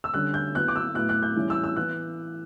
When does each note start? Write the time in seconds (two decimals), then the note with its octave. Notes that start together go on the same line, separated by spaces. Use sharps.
0.04 E6
0.14 D3 G3 C#4 F#6
0.34 G6
0.55 F#3 B3 E4 F#6
0.68 D6
0.76 E6
0.95 A2 F#3 B3 E4 F#6
1.09 F#6
1.23 G6
1.36 E3 G3 C#4 E4
1.50 E6
1.64 E6
1.76 E3 B3 E4 F#6